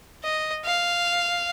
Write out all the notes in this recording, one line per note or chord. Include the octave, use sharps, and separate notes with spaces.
D#5
F5